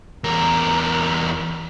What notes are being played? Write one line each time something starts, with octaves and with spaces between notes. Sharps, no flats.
E2 A#4